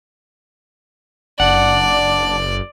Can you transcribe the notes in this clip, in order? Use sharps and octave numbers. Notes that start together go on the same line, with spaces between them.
F#1 D4 D5 F#5